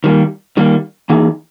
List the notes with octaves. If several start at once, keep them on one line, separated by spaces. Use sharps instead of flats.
D#3 G3 A#3
D#3 G3 A#3
E3 A#3 D#4 G#4